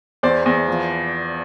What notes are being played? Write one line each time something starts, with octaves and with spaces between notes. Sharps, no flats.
E2 C5 D5
E2
F3